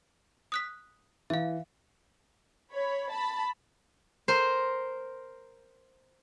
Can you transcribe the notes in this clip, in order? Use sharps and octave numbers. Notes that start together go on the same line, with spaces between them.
D#6 F#6 B6
E3 E5 F5
C#5 B5
A5 B5
A#4 C5